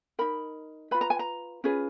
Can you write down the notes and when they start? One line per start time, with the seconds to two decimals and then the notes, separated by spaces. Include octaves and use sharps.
0.19 D#4 A#4 B5
0.91 F4 B4 B5
1.01 A#5
1.10 G#5
1.19 A#5
1.64 C#4 F4 G#4 B4